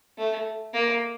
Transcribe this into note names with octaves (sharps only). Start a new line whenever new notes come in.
A3
A#3